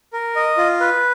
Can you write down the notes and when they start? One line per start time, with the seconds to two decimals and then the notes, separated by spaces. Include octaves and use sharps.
0.13 A#4
0.36 D#5
0.57 F4
0.80 B4